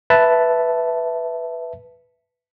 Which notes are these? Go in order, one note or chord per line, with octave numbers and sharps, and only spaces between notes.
B4 E5 A5